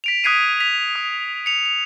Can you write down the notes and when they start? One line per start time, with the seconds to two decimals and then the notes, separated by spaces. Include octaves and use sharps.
0.04 B6 D7 F7
0.24 D#6 F#6 G#6 B6 C7 D#7
0.60 B6 F7
0.96 D#6
1.46 C#7 F7
1.66 F7